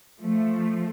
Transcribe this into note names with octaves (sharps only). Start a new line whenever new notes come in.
F3 A3